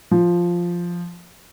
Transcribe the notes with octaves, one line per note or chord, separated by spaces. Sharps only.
F3